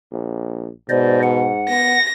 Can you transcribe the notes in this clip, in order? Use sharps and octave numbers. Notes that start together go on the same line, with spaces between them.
A#1
G#2 B2 C5 D5 D#5
F#5
B3 A#6